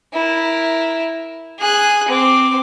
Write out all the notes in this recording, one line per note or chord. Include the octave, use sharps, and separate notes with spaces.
E4 A#4
G#4 F#6
C4 D6